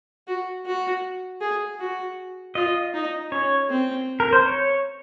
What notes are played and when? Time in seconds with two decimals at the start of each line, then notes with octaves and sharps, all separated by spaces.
0.27 F#4
0.66 F#4
1.41 G#4
1.79 F#4
2.55 F4 D#5
2.94 D#4
3.31 C#4 C#5
3.69 C4
4.20 A#4
4.33 C5
4.46 C#5